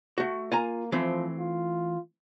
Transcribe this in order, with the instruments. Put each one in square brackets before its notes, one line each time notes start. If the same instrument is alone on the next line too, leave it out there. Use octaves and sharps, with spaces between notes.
[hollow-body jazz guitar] A3 F#4
[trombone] A#3 [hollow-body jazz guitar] F4 G#5 A#5
[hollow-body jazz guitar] E3 A3 C4 [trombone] F3
[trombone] F4